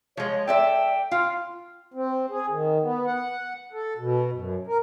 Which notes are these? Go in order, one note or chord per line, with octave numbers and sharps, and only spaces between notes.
F3 G#3 C#5
A4 D5 E5 G5
F4 F5
C4
G#4
D#3
B3
F#5
A4
B2
F#2
A#4